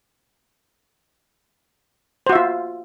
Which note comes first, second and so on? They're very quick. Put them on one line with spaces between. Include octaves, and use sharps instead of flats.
C5 F#4 E5 F4